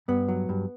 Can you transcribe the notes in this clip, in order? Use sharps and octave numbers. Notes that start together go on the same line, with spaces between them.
G2 B3
F#3
G2